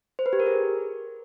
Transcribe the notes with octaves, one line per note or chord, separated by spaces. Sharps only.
C5
B4
G4
A#4
G#4